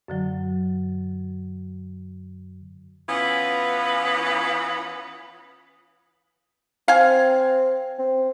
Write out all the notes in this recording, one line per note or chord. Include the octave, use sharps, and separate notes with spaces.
F#2 D3 F#3
E3 B3 C#4 F4
C4 F5 G#5
C4